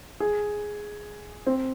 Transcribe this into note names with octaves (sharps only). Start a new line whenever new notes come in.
G#4
C4